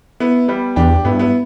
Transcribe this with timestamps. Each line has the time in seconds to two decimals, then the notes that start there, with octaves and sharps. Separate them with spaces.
0.20 B3 E4
0.48 G3 B3
0.76 E2 D4 G4
1.05 G2 B3 E4
1.19 B3 E4